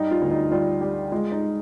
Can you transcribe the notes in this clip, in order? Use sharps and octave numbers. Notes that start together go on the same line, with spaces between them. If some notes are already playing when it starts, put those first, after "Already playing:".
Already playing: G2 G3 D#4
F4
D2
D#4
G3 F4
G3 G4
G#3 F4
D#4